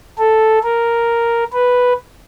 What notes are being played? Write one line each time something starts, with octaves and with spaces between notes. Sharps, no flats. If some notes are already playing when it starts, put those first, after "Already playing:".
A4
A#4
B4